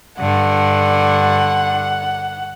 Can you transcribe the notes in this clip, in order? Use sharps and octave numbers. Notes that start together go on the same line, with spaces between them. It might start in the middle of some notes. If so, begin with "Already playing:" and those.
G2 D3 F#5